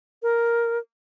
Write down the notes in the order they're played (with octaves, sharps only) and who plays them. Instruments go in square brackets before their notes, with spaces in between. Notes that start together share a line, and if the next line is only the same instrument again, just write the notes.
[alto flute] A#4